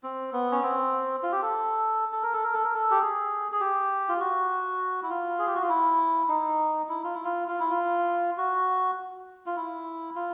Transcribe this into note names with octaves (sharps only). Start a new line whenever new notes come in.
C4
B3
C#4
C4
F4
G4
A4
A4
A#4
A4
A#4
A4
A#4
A4
G4
G#4
G#4
G4
F4
F#4
E4
F4
G#4
G4
F#4
F4
E4
D#4
E4
F4
E4
F4
F4
E4
F4
F#4
F4
E4
F4